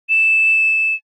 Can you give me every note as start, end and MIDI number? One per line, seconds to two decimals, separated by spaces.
0.09 0.94 100